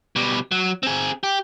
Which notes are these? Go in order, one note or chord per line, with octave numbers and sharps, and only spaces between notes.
B2 G3
F#3
C4 G#4
G4